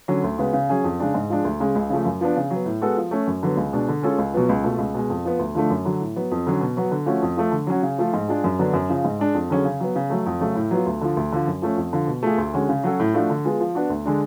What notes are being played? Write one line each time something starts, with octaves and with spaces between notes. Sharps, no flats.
D3 F#3 C#4
D2
C#3 G#3 B3 F#4
C#3
F#3 C#4 G#4
F2
C#3 G#3 D4
G#2
F3 G#3 D4
D2
C#3 G#3 C#4
C#2
C#3 F3 A3
F#2
F3 B3 D4
C#3
F#3 B3
A2
G#3 B3 F#4 A4
F3
A3 C#4
F#2
D3 F#3 B3
C#2
B2 G#3 D4
D3
G#3 C#4 F4 A4
C#2
B2 F#3 B3 F4
C#2
B2 A3 F4
C#2
B2 G#3
F2
F3 B3
D2
D3 F3 A3 D4
F#2
D3 F#3
A2
F#3 B3
F2
D3 F#3 C#4
B2
F#3 B3 F#4
D3
F3 A3 C#4 F#4
F2
F3 A3
D3
F#3 C#4 F#4
C#3
F3 A3 F4
G#2
G#3 D4 F4 G#4
F#2
D3 F#3 B3 D4
F#2
C#3 F3
G#2
G#3 D4
F2
D3 F#3 C#4 G#4
C#3
F#3 B3
C#3
F#3 A3
F2
C#3 F#3 A3
A2
F#3 B3 F4
D2
D3 F3
D2
D3 F3
F#2
F3 A3 C#4
F2
D3 F3
B2
A3 F4 G#4
D2
D3 G#3 C#4 F#4
C#3
F#3 C#4 F#4 A4
A2
F3 A3 D4 F#4
D3
G#3 B3 F4 G#4
F3
B3 D4 F#4
D2
D3 G#3 D4